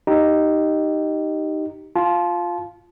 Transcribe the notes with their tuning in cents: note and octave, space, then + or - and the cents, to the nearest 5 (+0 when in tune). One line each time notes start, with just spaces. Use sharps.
D#4 +0 G4 -10
F4 +0 A5 -30